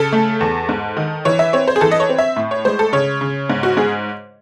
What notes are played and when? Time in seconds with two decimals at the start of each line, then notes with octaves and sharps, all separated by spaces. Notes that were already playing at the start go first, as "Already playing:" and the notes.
Already playing: C#3 A4
0.13 A3
0.41 E2
0.69 G#2
0.97 D#3
1.25 E3 C#5
1.39 E5
1.53 C4 C#5
1.68 C5
1.76 G#4
1.81 E3 A4
1.91 D#5
2.00 C#5
2.09 C4
2.18 E5
2.36 A2
2.51 C#5
2.65 G#3 C5
2.79 A4
2.93 C#3 C#5
3.21 C#3
3.50 G#2
3.63 F#4
3.77 G#2 G#4